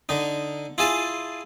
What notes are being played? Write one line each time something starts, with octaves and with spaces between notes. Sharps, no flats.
D3 D#4
E4 F4 G#4 G#5 A5